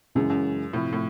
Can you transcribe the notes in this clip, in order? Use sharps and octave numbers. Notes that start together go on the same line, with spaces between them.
F#2 C#3 E3 G#3 C#4
F#2
A2 C3 F3 A3 C4 E4
A2